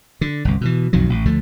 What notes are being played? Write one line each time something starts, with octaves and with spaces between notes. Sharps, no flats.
D3
G1 C2
B2 D#3 E3
B1 F2 D#3 F#3
A1
D2 D3 F3 A3